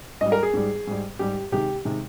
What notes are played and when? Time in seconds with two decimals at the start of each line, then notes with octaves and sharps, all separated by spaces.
0.21 G#2 G3 D#5
0.32 A#4
0.43 G#4
0.54 G#2 G3
0.87 G#2 G3
1.19 G#2 G3 G4
1.52 C3 D#3 G#3 G4
1.85 C3 D#3 G#3